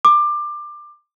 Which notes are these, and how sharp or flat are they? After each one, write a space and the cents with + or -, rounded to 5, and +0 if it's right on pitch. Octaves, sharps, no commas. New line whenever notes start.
D6 +20